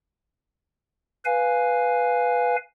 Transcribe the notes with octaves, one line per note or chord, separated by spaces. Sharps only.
B4 F5 G#5